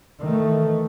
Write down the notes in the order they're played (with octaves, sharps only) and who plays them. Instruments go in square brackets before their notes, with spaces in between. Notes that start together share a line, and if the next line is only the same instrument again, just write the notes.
[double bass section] D#3 E3 A3